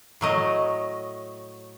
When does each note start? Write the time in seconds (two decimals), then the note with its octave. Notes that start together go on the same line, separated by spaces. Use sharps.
0.21 A2 F#3 D#5